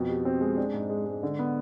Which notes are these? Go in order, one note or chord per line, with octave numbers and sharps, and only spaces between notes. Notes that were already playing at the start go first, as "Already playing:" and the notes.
Already playing: F2 B2
G4
C4
G#3
D4
G#2
G#3
G#3
D3
B3